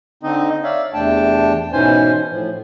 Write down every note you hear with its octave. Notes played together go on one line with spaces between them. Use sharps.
D3 C4 D#4 D#5
C#5 D5 E5 F5
E2 C3 A3 D4 G5 A5
G#2 B2 E3 C#4 C5 G#5
A2 F3